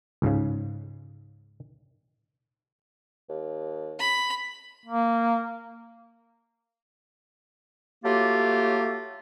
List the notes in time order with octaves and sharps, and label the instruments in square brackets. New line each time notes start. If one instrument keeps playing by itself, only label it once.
[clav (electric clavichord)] C#2 G#2 C#3
[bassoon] D#2
[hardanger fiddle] B5
[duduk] A#3
[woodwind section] F#3 A3 A#3 F4 G4